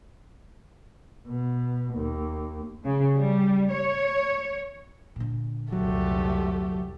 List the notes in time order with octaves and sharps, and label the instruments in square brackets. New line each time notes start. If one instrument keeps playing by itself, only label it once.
[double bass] B2
D#2
[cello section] C#3
G3
C#5
[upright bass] A#2 D3
[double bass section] C2 F2 [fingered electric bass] F#3 [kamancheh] A3 G4